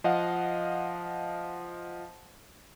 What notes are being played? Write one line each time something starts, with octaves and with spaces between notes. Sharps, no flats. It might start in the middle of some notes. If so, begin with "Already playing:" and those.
F3 D#5 F5 F#5